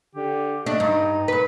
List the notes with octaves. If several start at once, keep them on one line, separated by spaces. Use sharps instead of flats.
D3 G4
A3 D4 D#5
G2 D#4
G2 B4